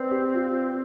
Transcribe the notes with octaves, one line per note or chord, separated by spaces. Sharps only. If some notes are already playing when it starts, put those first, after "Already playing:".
Already playing: C4 B4 D5
G4
F4